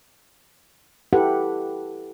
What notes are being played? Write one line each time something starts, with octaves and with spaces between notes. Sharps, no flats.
E4 G4 A4 B4 F#5